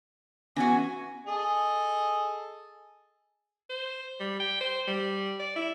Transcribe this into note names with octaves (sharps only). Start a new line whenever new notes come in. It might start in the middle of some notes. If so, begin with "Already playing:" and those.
E3 B3 C#4 F#4 G#5
G#4 A4 D#5
C5
G3
G5
C5
G3
D5
E4